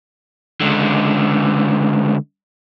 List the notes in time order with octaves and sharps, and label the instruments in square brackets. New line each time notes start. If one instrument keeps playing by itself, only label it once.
[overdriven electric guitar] C#2 D3